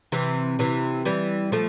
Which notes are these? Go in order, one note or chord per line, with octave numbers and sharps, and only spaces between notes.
C3 E3
C3 E3
E3 G3
F3 A3